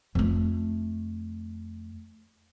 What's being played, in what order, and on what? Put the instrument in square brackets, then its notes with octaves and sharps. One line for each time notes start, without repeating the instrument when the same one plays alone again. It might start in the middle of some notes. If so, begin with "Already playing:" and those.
[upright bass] F2 A3